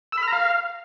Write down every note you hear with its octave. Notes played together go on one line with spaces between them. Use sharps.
E6
B5
F6
A#5
F5